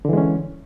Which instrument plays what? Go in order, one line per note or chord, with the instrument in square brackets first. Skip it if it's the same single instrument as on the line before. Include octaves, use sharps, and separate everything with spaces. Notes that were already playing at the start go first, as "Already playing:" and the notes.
[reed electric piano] D3
E3
G#3
C#4